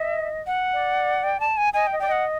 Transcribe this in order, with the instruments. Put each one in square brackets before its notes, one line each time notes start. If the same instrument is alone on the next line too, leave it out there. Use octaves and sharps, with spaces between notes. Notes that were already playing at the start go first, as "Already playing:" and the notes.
Already playing: [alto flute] D#5 [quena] E5
[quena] F#5
[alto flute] D5
[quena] G5
A5
G#5
[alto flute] D#5 [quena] G#5
[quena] G5
[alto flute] D#5
[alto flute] D5 [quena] G5
[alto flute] D#5 [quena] F#5